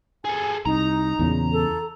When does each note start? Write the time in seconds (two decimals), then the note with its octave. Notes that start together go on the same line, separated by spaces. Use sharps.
0.25 G#4 A4 G#5
0.66 C2 D#4 A#5
1.19 E2 A#2 C#3
1.52 A4